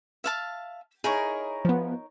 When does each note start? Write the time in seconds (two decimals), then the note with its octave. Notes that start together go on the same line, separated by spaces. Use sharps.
0.24 E5 F5 A5
1.04 D#4 E4 G#4 A#4 C#5
1.65 F3 B3